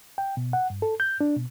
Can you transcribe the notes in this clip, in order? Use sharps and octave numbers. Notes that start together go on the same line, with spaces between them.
G5
B2
F#5
G2
A4
G6
D4
B2